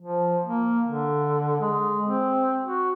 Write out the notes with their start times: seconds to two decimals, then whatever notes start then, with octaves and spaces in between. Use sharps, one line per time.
0.01 F3
0.46 A#3
0.88 D3
1.61 G#3
2.07 C4
2.65 F#4